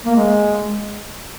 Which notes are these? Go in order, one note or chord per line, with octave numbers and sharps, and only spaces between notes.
A#3
G#3